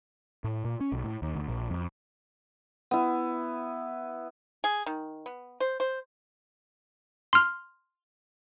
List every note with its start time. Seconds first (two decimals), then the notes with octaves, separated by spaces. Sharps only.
0.44 A2
0.65 A#2
0.81 C#4
0.92 B1
1.04 A2
1.22 D#2
1.36 D2
1.48 A#1
1.70 F2
2.91 B3 E4
4.64 G#4
4.86 D#3
5.26 B3
5.60 C5
5.80 C5
7.33 C6 F6